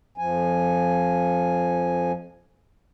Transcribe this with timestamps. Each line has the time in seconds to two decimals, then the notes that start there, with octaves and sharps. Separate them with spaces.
0.18 F2 F3 G#5